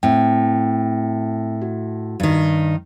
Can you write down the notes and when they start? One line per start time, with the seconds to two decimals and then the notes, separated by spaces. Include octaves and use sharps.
0.03 A2 C4 G5
1.62 F#4
2.20 G2 D#3